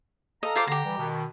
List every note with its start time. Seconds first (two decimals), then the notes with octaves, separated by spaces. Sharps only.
0.43 A4 D#5 F5 A#5
0.56 F4 C5 D6
0.67 D3 G4 A#5
0.84 E3 G3
0.98 B2 D#3